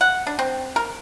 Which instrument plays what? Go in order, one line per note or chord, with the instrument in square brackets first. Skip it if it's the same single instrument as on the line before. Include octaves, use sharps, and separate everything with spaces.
[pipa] F#5
D4
C4
A#4